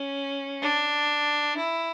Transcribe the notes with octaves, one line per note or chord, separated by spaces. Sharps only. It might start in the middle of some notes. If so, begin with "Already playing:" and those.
Already playing: C#4
D4
E4